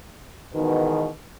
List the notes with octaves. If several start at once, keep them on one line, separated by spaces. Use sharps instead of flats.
E2 G#2 B2 D#3